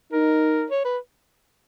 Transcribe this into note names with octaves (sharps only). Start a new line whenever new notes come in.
D#4 A#4
C#5
B4